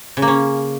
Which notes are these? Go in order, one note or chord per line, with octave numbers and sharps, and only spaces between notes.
C#3
A#3
C#4